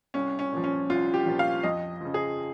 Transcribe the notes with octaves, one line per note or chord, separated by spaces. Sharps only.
C2 C#4
C#4
A#2 F3
C#4
C2 F4
G4
A#2 F3
F5
F2 D#5
C#3 F3
G#4